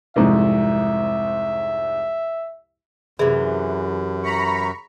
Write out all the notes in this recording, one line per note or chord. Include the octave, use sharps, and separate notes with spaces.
C2 F2 G#2 E5
F#2 C3 E3 G#4
A#5 B5 C#6